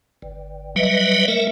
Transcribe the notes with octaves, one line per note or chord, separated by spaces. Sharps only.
G1
F#3 G3 B4 D#5 E5
A3 A#4 E5